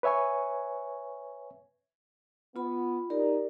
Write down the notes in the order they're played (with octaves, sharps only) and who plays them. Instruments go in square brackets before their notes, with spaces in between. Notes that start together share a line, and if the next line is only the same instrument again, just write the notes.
[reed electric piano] B4 C#5 E5 G#5 C#6
[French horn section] B3 [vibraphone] F4 B5
[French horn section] D#4 [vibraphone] G4 A#4 D5